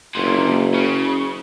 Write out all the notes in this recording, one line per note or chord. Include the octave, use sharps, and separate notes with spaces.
F#1 D2 A#2
C#3